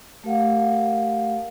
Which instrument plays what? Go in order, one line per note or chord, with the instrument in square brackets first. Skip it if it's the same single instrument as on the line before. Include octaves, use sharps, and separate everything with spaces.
[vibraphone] A3 G4 A#4 F5 F#5